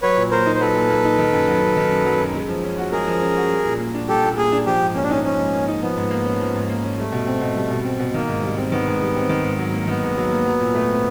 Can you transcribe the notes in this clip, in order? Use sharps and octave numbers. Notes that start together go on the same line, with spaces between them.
F#3 B4 C#5
A#2
A#3 A#4 C5
D#4
C5
F#3 A4 B4
A#2
A#3
D#4
D#3
F#2
F#3
F#2
D#3
F#2
F#3
F#2
G#3
F3
C#4
F#4
G#3 G#4 A#4
F3
C#4
F#4
G3
A#2
A#3
D4
G3 G4 A4
A#2
A#3 G#4
D4
F3 G4
G#2
A#3 C#4
D4
C#4 D#4
F3 C#4
G#2
A#3
D#4
F3 B3
G#2
A#3
C#4
F3
G#2
A#3
C#4
G3 A3
B2
C4
B2
G3
B2
C4
B2
D#3 A#3
G#2
G3
C4
D#3 B3
G#2
G3
C4
D#3
G#2
F#3
A#3
D#3 B3
G#2
F#3
A#3
F#3
A#2
A3
C4